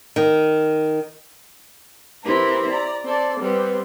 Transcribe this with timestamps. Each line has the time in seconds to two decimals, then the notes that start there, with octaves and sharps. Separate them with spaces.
0.16 D#3
2.24 C4 E4 G4 A#4 B4
2.68 D5 A#5
3.04 C4 A4 D5
3.40 G3 B3 C4 G4